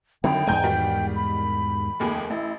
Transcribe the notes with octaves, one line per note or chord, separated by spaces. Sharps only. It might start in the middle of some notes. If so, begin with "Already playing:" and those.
C2 F2 D3 D#3 F#3 G5
E2 G#2 G#3 G#5 A#5 G6
D#3 G3 F#4
B5
F1 D#2 G#4
A1 E4